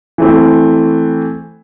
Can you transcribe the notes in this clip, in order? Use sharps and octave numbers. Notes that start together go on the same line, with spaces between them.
E3 A3 C4